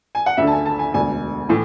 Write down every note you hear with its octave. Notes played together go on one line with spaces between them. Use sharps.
G#5
F#5
D2 D3 E5
A5
G#5
A5
G#5
E1 D2 D3 G#5
A2 E3